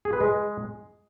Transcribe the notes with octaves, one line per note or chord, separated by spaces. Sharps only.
G#4
B4
G#3